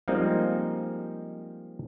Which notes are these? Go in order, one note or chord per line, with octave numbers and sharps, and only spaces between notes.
F3 G3 G#3 A#3 C4 D#4